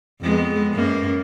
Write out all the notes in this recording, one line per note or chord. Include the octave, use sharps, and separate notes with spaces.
F2 G#3 B3
F#2 A#3